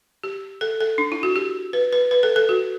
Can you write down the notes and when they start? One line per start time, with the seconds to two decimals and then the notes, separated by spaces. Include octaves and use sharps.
0.23 G4
0.61 A4
0.80 A4
0.98 D4
1.12 E4
1.23 F#4
1.36 G4
1.73 B4
1.93 B4
2.11 B4
2.23 A4
2.36 A4
2.49 F#4